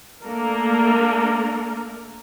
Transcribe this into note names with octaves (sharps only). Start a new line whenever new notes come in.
A3 A#3 D4 A4 A#4